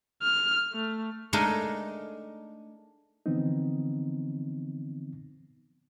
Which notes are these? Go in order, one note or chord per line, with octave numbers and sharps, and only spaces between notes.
F6
A3
G#3 A3 D4 D#4 A4 A#4
D3 E3 F3 B3 C4 D#4